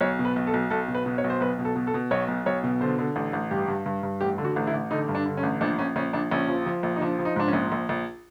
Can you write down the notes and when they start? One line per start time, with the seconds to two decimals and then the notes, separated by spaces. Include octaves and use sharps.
0.01 B1 C#5
0.19 B2
0.25 B4
0.36 B1
0.47 A4
0.54 B1
0.70 B1 A4
0.88 B2
0.95 B4
1.06 B2
1.18 C#5
1.24 B1
1.30 C5
1.40 B1 B4
1.59 B2
1.65 A4
1.76 B2
1.87 A4
1.94 B2
2.11 B1 C#5
2.28 B1
2.46 B1 C#5
2.64 B2
2.81 D3 C5
2.99 D3
3.16 A1
3.33 A1
3.51 G2 G4
3.68 G2
3.86 G2
4.03 G2
4.21 A1 G4
4.38 D3
4.45 F#4
4.56 A1
4.67 E4
4.74 A1
4.91 D3 D#4
5.09 G2
5.15 D4
5.26 D3
5.37 C#4
5.43 A1
5.61 A#1 D4
5.79 A#1 C#4
5.96 A#1 C#4
6.13 A#1 D4
6.31 A#1 C#4
6.48 F3
6.66 F3
6.83 A#1
6.96 D#4
7.01 F3 D4
7.19 F3
7.25 D#4
7.36 G#2 D4
7.48 C#4
7.53 A#1
7.72 A#1
7.89 A#1